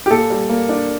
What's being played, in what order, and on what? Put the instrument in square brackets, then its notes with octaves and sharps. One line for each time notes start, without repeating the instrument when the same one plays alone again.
[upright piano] G4
A#2 A4
G3
A#3
D4